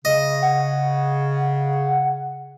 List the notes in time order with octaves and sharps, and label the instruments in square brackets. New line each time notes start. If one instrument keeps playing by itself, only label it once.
[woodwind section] C#3 [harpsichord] D#5
[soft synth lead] F#5